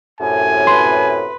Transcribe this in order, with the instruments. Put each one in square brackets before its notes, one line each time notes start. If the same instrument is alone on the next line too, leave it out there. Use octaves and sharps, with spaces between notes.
[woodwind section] F#2 A2 C3 [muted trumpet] G#5
[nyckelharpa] B4 [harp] C6